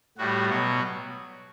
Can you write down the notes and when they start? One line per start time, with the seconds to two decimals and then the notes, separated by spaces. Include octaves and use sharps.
0.18 A2 G3 F#4
0.49 B2 F#3 F#4